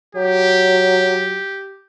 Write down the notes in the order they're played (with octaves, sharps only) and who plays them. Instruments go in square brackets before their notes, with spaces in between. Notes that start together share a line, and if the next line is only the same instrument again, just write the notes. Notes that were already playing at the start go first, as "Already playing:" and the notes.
[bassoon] F#3 [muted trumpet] G4